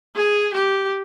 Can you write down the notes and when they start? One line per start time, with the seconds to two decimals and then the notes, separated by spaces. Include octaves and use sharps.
0.15 G#4
0.54 G4